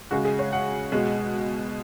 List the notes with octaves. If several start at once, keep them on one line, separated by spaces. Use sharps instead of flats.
C#3 G#3 F#4
G#4
C#5
F#5
B2 G#3